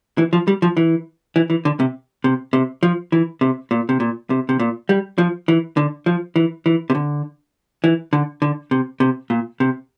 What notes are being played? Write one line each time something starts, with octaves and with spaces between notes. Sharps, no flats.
E3
F3
G3
F3
E3
E3
E3
D3
C3
C3
C3
F3
E3
C3
A#2
C3
A#2
C3
C3
A#2
G3
F3
E3
D3
F3
E3
E3
C3
D3
E3
D3
D3
C3
C3
A#2
C3